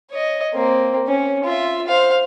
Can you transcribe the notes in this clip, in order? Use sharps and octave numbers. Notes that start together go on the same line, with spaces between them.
C#5 D#5
A#3 C4
C#4
F4 E5
C5 F5